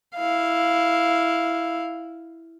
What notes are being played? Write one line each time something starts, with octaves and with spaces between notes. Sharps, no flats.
E4 F5